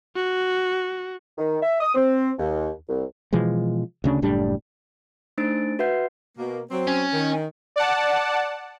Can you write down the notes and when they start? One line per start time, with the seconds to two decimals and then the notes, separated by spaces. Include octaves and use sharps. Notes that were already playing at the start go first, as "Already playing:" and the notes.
0.15 F#4
1.38 D#3
1.62 E5
1.81 D#6
1.95 C4
2.39 D#2
2.89 C2
3.33 B2 E3 F3 G#3
4.04 D2 C#3 D4
4.22 F#1 A2 G3 D4
5.38 A3 D4 D#4 C5 A6 D7
5.79 F#4 B4 E5 F#5 G6 C7
6.38 B2 A#3
6.71 F#3 C4
6.87 C#4
7.14 D#3
7.76 D5 F#5 A5